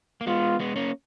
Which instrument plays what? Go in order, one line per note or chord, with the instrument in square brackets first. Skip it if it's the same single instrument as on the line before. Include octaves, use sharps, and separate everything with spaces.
[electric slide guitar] A#3
[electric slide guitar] G#3 B3 [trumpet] F4
[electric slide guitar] G#3 B3
A#3 C#4